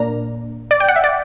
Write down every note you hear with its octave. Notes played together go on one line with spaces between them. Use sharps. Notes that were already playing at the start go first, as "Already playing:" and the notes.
Already playing: A#2 A#3 D4 A#5
D5
G5
F#5
E5
D5